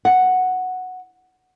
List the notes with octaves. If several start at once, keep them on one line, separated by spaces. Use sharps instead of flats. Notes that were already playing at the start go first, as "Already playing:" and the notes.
F#5